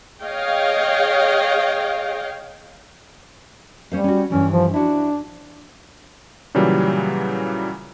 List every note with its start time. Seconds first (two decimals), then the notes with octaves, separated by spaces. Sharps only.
0.21 G#4 C#5 D#5 F5 G5
3.92 G3 C#4 C5 F5
4.04 C#4 F#4
4.30 G2 E3 G3 C#4
4.52 F3
4.74 D4 E4 F#4
6.54 A#2 C#3 E3 F#3 G3